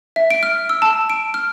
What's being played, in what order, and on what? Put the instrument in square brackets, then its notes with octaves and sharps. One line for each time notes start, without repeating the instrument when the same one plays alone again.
[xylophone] E5
D7
F6
E6
A5
D7
F6